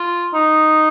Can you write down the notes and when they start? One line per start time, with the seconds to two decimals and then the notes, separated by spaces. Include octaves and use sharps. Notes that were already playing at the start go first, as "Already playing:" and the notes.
Already playing: F4
0.34 D#4